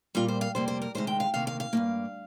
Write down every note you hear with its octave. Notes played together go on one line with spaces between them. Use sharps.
A#2 G3 A#3 F4
C5
F5
F2 C3 G3 A#3 C5
C5
A#4
D2 C3 D#3 G#3 C5
G5
F5
D2 C3 D#3 A#3 F5
F5
F5
G2 D#3 A#3